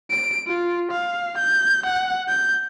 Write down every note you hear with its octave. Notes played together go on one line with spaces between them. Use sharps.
D7
F4
F5
G6
F#5
G6